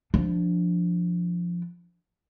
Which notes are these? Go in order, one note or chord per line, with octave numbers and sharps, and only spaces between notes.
F3 D4